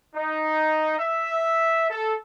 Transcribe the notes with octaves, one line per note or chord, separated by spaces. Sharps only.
D#4
E5
A4